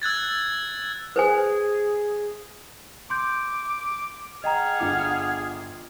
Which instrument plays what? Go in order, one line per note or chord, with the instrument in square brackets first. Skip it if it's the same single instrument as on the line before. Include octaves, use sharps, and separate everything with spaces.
[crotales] E6 F#6 G#6 A6
[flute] G#4 [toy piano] B4 C5 G#5
[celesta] C6 G6 [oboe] D6
[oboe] G#4 [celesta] D#5 G5 A#5 [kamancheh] F#5 F6
[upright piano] G1 F4 D6